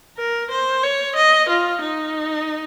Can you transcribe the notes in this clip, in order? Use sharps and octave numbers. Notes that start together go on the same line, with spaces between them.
A#4
C5
C#5
D#5
F4
D#4